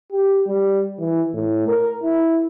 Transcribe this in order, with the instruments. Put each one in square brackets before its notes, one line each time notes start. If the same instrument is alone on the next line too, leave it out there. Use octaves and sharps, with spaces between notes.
[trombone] G4
G3
E3
A2
A#4
E4